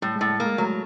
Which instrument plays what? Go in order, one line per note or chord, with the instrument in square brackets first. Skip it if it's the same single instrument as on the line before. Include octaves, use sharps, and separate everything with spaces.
[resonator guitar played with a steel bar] A2 [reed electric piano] G3
[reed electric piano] G#3
[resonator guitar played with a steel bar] A2
[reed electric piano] A3
[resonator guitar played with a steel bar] A#3
[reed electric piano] G#3
[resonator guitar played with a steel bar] F#3 [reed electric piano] A3